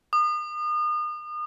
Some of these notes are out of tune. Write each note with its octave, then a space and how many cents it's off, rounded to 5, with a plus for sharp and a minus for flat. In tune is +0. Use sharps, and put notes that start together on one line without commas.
D#6 -35